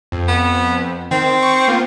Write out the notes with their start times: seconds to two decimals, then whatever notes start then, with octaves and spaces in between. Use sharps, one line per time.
0.12 F2
0.28 B3
1.11 D#3 C4
1.43 C#6
1.68 A#3 B3 F4